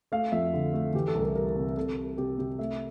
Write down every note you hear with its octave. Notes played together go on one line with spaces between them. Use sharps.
A3 F5
F2 E5
D3
A3
E3 G4
A4
C2
A#4
G3 A#4
C3
C3 A4
G3
C3 G4
C3 G4
A3 E5